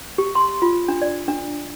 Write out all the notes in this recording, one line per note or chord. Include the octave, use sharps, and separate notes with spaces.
G4
C6
F4
D4
D5
D4